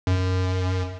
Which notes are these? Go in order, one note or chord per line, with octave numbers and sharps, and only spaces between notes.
F#2